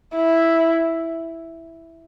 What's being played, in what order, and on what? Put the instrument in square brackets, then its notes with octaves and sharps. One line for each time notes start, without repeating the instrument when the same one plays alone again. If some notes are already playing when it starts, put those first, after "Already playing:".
[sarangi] E4